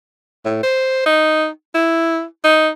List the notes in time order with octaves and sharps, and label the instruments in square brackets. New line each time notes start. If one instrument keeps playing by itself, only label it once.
[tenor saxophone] A2
C5
D#4
E4
D#4